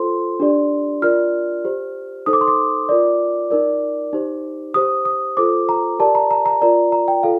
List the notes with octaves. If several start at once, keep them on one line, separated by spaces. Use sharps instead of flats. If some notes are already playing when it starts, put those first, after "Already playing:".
Already playing: F4 A4 C5 C6
D4 G4 D5
F4 A#4 D5 F6
G4 C5
D#4 A4 C5 D#6
D6
C6
D6
F4 A#4 D5
D#4 A#4 D5
D#4 G4 C5
G4 C5 D#6
D#6
F4 A4 C5 D6
A#5
G4 A#4 D5 A5
A#5
A#5
A#5
F4 A#4 D5 A#5
A#5
G5
F4 A4 F5